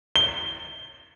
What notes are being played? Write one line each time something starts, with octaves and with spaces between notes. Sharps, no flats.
G7